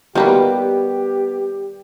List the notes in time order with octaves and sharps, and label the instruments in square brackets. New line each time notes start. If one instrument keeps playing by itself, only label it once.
[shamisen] D#3 A#3 B4 [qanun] G3 [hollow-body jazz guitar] B3 F#4 [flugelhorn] G4